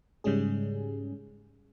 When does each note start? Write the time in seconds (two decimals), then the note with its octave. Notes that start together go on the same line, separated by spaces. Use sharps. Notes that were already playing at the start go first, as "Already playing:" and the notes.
0.24 G#2 C#3 G3 G#3 C#4 G#4